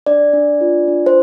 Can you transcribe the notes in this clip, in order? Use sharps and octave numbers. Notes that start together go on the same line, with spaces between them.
D4 D5
D4
F4
D4
C5